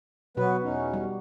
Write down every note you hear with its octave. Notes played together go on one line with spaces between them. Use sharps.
B2 F#3 B3 F#4 B4
E2 C#4 D#4
G3